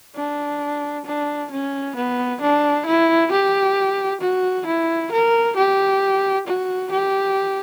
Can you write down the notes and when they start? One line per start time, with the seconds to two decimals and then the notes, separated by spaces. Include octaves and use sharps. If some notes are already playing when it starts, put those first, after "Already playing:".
0.16 D4
1.06 D4
1.51 C#4
1.96 B3
2.41 D4
2.86 E4
3.31 G4
4.21 F#4
4.67 E4
5.12 A#4
5.56 G4
6.47 F#4
6.91 G4